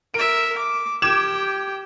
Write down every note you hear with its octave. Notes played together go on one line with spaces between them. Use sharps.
A#4 E5 D7
D6
G4 G5 D6 G#6 E7